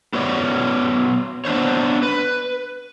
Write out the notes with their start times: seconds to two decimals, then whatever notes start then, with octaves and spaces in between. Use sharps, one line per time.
0.13 B3 F#4 C#5 D5
1.45 B3 D4 C5 C#5
2.03 B4